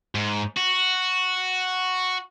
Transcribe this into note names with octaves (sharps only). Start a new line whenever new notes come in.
G#2
F#4